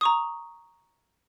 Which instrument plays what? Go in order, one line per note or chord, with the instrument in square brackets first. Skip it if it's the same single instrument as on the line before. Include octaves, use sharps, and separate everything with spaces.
[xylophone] A#5 C#6 D#6